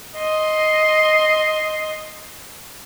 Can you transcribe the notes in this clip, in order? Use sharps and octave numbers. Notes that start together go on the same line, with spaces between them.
D#5 C6